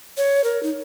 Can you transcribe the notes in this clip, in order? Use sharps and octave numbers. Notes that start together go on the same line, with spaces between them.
C#5
A#4
D#4